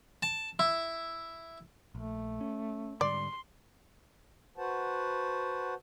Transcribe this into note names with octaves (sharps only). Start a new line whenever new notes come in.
A5
E4
A#1 A3
C#4
G#2 D3 G3 D5 C6
F#4 B4 C5 F#5 A5